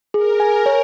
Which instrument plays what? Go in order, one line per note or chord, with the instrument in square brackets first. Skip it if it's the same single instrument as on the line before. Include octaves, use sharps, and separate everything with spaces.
[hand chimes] G#4 [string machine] A#4
[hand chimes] G#5
C#5